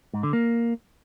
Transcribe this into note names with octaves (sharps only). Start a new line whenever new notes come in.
G#2
D3
A#3